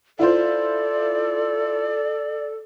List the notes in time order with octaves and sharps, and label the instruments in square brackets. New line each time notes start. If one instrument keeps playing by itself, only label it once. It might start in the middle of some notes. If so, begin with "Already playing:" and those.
[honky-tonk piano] E4 F4 C5 [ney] A4 [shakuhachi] D5